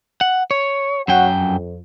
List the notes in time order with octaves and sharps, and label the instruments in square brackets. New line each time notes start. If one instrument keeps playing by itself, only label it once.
[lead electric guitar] F#5
C#5
[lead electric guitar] F#2 G5 [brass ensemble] F#4 C#5 F#5
[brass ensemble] F2